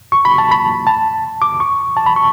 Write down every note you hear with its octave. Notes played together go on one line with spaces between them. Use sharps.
C#6
B5
A5
B5
A5
D6
C#6
A5
B5
C#6